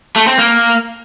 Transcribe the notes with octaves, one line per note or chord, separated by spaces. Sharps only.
A3
C4
A#3